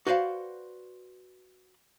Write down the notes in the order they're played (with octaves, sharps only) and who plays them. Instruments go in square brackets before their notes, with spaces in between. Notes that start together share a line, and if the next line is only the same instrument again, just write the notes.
[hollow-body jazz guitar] F#4 B4 C5 D5 F5 F#5